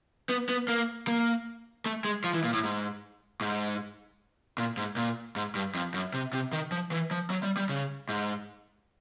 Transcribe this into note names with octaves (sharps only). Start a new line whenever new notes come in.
B3
B3
A#3
A#3
A3
G#3
F3
E3
A#2
A2
G#2
G#2
A#2
G#2
A#2
G#2
G2
F2
F#2
C3
C3
D#3
F3
E3
F3
F#3
G3
G3
C#3
G#2